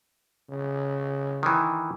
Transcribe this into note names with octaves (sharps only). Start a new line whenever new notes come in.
C#3
D#3 E3